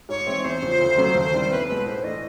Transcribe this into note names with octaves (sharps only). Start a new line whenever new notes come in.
G#2 C#5
E3 G#3 C4 E4
E2 C5
C#3 F3
D2
C#3 F#3 A3 C#4
D#2
D#3 G3 C4 E4
B1 B4
B2 G#3 B4
A2 C5
E3 A3 D4 D#5